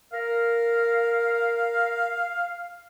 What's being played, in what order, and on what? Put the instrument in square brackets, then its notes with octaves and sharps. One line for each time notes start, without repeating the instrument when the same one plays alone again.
[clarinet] A#4 [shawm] F5